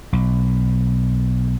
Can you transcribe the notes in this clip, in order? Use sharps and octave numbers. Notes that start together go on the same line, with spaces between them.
B1